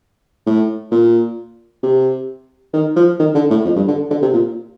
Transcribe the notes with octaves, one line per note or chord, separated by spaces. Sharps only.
A2
A#2
C3
D#3
F3
D#3
D3
A2
F2
G2
D3
D3
C3
A#2